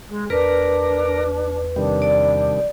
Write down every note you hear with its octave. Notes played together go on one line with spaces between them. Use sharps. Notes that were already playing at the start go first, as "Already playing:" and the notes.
G#3
E2 D4 A#4 B4
C3 D#3 G3 D4
D5